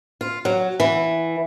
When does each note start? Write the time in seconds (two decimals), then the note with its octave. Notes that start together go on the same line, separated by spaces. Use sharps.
0.21 F4
0.45 F#3
0.80 E3